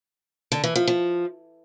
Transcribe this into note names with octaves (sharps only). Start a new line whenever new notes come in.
D3
E3
F3
F3